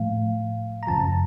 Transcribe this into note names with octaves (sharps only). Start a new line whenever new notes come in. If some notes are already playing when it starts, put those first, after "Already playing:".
Already playing: A2 F3 A3 F5
A#5
F#2 C#3 F3 A5